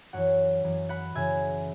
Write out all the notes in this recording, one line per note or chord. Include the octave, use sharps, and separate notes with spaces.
F#2 E3 C#5 F#5
F#2 E3
F#5 B5
F#2 C#3 E3 E5 G#5